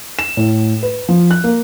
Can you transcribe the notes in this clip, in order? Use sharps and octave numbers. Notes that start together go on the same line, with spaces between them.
E7
A2
B4
F3
F#6
A#3